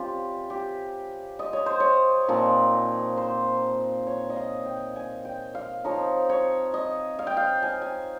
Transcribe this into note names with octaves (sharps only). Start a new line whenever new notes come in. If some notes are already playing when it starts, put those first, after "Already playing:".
Already playing: C3 G3 C#4 F4 G4
G4
D#5
C#5
C5
C#5
A#2 F3 C4 D#4
C5
C#5
D#5
F5
G5
G#5
G5
F5
F3 C4 D#4 C#5
C#5
D#5
F5
G5
F5
G#5
G#5